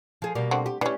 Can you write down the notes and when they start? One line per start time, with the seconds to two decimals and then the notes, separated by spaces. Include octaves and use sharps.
0.22 F3 G#4
0.35 B2 G3 A#3
0.51 D3 C4 F#4
0.66 G4
0.81 E3 C#4 D4 G4